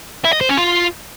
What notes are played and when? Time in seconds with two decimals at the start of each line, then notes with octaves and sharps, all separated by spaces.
0.25 E4
0.33 D#5
0.41 C5
0.49 C#4
0.57 F4